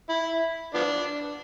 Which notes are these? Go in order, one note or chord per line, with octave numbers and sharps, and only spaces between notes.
E4
F3 B3 D4